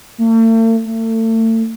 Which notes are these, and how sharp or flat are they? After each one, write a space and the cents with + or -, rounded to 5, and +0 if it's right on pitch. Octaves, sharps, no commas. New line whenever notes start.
A3 +45
A3 +35